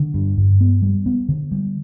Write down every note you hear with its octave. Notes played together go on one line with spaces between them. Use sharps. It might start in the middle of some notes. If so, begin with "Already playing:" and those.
Already playing: D3
G2
G2
B3
G3
B3
D3
G3